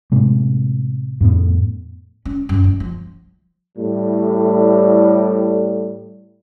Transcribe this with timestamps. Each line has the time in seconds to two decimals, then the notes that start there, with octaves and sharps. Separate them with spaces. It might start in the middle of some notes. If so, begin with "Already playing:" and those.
0.12 A2 C3 G#3
1.21 F2 A2 B3
2.25 C#4
2.49 F#2
2.64 A3
2.80 F3
3.78 A2 G3